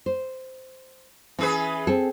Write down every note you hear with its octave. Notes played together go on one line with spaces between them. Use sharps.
C5
E3 C#4 G#4 B4
C4 G#4 A4